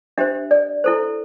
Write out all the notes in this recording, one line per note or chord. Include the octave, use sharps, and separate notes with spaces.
D4 G4 C5 E5
D5
E4 A4 C5